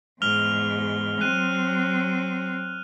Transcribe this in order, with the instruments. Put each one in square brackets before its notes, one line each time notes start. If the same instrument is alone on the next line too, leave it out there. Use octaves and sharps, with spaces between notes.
[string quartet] E2 G#2 [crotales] F6 F7 G7
[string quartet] F#3 C4 [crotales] F#6 D#7